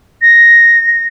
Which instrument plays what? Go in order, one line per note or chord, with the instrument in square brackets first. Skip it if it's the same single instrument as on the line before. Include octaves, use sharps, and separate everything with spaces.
[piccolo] A#6